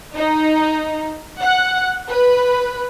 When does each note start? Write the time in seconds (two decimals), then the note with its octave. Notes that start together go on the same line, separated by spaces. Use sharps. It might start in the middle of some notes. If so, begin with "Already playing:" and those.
0.16 D#4
1.41 F#5
2.10 B4